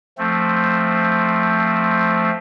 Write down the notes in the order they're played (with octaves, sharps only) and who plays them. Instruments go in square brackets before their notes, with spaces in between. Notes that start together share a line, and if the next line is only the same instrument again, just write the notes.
[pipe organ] F3 A3 C4